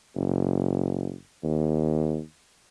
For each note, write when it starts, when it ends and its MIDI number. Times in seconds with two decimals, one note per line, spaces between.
0.15 1.15 30
1.43 2.19 39